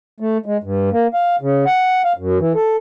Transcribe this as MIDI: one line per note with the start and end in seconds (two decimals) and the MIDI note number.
0.20 0.38 57
0.46 0.57 56
0.64 0.90 43
0.92 1.07 58
1.14 1.36 77
1.41 1.65 49
1.66 2.02 78
2.05 2.13 77
2.17 2.38 42
2.39 2.53 52
2.55 2.77 69